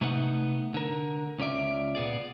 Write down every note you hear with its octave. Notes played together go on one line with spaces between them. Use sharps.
C3 A3 B3 D#4 E5 F#5
D3 A#4
C#2 C#4 F4 D5 E5
A#2 B3 G#4 D5